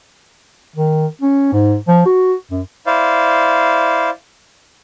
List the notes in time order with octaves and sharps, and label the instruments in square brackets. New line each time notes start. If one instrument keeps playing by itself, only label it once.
[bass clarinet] D#3
C#4
G#2
F3
F#4
F#2
[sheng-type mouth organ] E4 C5 D5 F5